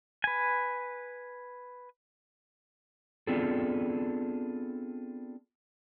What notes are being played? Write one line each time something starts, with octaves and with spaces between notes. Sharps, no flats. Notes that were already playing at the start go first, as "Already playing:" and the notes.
B4 G#5
B3 C4 D4 F4 G#4 A4